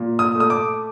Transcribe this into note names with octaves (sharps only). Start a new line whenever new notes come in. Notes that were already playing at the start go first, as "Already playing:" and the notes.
Already playing: A#2
D#6
A3
D#6
D6